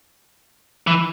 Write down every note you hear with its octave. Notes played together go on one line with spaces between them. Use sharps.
E3